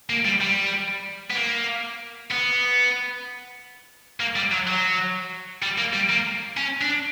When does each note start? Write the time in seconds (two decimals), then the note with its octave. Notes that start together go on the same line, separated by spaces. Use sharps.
0.10 A#3
0.25 G3
0.41 G3
1.30 B3
1.36 A#3
2.31 B3
4.20 A#3
4.36 G3
4.52 F#3
4.67 F#3
5.63 G3
5.78 A#3
5.93 G3
6.10 A#3
6.57 C#4
6.81 D4